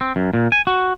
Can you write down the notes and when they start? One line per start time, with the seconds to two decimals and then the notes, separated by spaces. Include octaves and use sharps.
0.01 C4
0.16 F#2
0.34 A#2
0.52 G#5
0.67 F#4